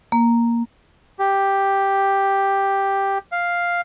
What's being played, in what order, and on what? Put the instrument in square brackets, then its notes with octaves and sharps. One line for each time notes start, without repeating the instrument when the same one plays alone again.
[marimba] A#3
[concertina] G4
F5